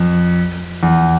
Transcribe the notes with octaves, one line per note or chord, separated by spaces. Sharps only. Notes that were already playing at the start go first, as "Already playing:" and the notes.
Already playing: F2
E2